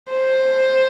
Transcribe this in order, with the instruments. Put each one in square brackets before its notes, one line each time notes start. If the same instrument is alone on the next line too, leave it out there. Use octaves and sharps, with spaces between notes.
[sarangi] C5